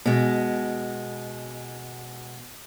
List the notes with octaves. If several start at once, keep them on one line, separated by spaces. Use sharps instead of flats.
B2 G#3